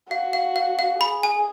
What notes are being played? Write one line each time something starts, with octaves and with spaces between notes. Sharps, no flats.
F#4 F5
F5
F5
F5
G#4 B5
G#5